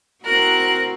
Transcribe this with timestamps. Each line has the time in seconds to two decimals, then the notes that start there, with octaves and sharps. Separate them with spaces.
0.23 C4 E4 F#4 A#4 F#6